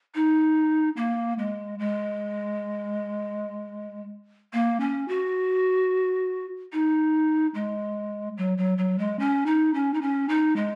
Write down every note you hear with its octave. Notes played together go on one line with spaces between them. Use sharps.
D#4
A#3
G#3
G#3
A#3
C#4
F#4
D#4
G#3
F#3
F#3
F#3
G#3
C#4
D#4
C#4
D#4
C#4
D#4
G#3